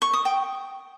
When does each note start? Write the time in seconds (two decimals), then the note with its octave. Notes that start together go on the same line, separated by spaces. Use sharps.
0.02 C#6
0.13 D#6
0.25 G5